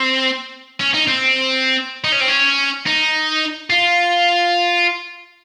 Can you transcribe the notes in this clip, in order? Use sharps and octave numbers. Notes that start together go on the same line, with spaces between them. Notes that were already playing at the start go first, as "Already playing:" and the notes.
Already playing: C4
C#4
D#4
C4
D#4
C#4
C4
C#4
D#4
F4